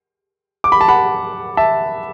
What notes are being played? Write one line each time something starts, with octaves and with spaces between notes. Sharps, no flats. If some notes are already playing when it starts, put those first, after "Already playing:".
D6
B5
A5
F#5 B5
E5 A5